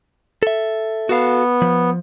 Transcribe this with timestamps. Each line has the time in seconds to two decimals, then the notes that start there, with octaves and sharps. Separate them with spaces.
0.43 A4 E5
1.09 B3 F#4 A4 F5
1.62 F3